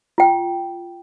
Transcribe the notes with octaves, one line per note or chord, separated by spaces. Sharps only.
F4 G5